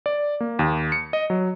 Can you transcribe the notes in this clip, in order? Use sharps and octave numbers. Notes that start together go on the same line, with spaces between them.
D5
A#3
D#2
C#7
D#5
F#3